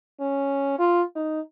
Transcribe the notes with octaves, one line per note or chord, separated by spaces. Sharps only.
C#4
F4
D#4